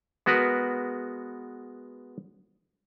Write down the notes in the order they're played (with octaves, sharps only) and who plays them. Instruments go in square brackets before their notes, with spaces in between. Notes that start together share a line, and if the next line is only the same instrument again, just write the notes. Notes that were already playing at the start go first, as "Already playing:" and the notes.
[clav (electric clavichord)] G#3 B3 F#4 A#4 B4